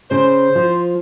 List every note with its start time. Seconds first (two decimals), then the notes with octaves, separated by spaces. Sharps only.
0.11 C#3 C5
0.55 F3